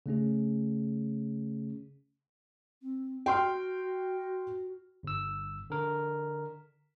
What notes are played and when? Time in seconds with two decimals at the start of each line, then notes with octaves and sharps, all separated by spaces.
0.06 C#3 A3 C#4 G#4
2.81 C4
3.26 F#4 G5 C6 F6
5.03 G1 E6
5.70 D3 A#4